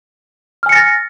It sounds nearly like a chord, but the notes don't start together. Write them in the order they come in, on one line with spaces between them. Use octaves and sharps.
F6 G#5 C#7 A#6 A6